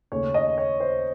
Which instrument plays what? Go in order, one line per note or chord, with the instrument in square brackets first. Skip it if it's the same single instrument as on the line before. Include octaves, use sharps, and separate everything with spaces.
[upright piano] D#2 C#3 A3 C#4 C#5
D#5
C#5
C5